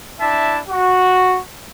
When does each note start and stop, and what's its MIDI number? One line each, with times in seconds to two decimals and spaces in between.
0.20 0.58 62
0.20 0.58 64
0.20 0.58 76
0.20 0.58 81
0.69 1.38 66